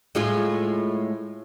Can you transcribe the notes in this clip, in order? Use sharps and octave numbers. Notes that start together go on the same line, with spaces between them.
A2 G#3 F4